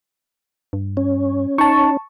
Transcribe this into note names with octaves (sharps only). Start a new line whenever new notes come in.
G2
C#4
D#4 A5 C#6